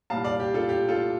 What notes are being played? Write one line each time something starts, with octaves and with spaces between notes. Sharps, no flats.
C2 A#2 G3 F5 A5
D5 F5
G4
F4 A4
G4
F4 A4